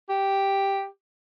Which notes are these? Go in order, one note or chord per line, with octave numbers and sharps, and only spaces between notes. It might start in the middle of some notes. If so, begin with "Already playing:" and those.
G4